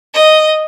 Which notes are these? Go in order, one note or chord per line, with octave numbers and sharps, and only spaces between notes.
D#5